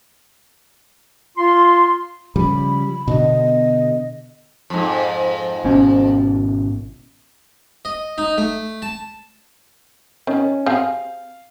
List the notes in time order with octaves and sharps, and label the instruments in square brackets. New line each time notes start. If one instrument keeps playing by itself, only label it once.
[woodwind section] F4 C6
[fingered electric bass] C#3 F3 G3 [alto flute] B5
[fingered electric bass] B2 D3 B3 [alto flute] D#5
[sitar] F2 G#2
[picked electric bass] G#1 B2 C#4
[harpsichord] D#5
D#4
A3
A5
[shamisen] D#3 [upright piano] C#4
[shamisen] C4 G4 G#4 [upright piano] F5